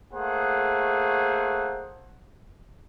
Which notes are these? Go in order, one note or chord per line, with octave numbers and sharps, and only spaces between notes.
A3 A#3 G#4 C5 F#5